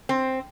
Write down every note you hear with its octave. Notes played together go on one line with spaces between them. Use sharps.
C4